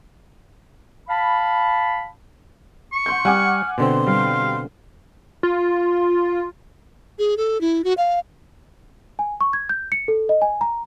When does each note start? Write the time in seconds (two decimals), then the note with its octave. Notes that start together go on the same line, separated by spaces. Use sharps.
1.09 F5 A5 B5
2.92 C#6
3.06 F#5 C6 G6
3.25 G3 F#5 G#5 D6 F6
3.78 B2 D3 C4 C6
4.07 G3 F5
5.43 F4
7.19 G#4
7.37 A4
7.61 E4
7.84 F#4
7.97 F5
9.19 G#5
9.41 C#6
9.53 G#6
9.69 G6
9.92 C#7
10.08 A4
10.29 D#5
10.42 G#5
10.61 A#5